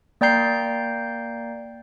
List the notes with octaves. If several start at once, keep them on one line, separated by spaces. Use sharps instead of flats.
A#3 D5 G5 A#5 G6 C7